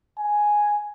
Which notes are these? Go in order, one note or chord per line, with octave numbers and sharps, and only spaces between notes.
G#5